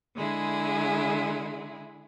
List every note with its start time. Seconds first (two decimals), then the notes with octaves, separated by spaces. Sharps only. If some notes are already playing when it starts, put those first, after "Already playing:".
0.15 D3 G#3 E4 G#4